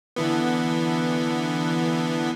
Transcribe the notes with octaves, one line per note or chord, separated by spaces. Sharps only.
D3 E3 B3